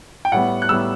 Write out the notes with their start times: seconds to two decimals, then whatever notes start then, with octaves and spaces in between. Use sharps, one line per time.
0.25 G5
0.32 A2 G3 B3 F#5
0.62 F#6
0.69 A2 G3 B3 E6